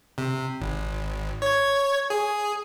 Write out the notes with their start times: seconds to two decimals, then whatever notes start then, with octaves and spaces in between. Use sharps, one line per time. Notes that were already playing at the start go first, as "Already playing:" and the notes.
0.18 C3
0.61 G#1
1.42 C#5 G#6
2.10 G#4